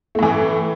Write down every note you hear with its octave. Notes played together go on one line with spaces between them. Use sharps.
A2 E3 A3